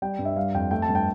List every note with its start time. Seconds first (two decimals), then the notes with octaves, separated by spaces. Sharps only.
0.02 G3 G5
0.19 G2
0.25 E5
0.36 G3 F5
0.54 F2 G5
0.71 A3 G5
0.82 A5
0.89 G2
0.95 G5